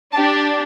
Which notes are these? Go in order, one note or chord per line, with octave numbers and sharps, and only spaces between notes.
D4 G4 A5